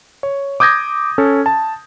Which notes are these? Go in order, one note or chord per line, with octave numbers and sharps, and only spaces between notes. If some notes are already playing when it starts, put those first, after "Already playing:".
C#5
D6 D#6 G6 G#6 A#6
C#4 A4
A5